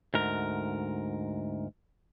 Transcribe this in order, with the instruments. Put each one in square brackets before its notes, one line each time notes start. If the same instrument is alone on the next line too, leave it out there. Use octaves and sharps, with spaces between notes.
[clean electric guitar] D2 G#2 A#4